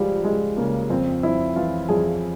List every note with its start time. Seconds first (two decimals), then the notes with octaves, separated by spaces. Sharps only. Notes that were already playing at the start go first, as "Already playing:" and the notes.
Already playing: C#2 F3 G3 G#3
0.24 C#2 G#3
0.57 C#3 A#3
0.90 F2 C4
1.23 F2 E4
1.56 E3 F4
1.89 F2 G#4